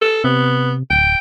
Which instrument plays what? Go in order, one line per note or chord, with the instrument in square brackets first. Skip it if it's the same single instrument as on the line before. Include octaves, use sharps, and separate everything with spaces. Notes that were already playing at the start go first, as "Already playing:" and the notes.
[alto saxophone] A4
[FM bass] C3 [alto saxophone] B3
[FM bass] D1 [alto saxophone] G5